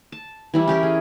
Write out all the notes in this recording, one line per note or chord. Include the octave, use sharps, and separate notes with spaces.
A5
E3 G3 E4
C#4 G4 A#4
G#4